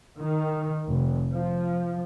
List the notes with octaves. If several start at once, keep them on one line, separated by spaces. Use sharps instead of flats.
D#3
F1
F3